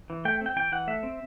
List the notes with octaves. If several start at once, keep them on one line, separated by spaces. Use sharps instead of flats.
E3
A3 G5
C4 G5
E3 G5
E3 F#5
A3 E5
C4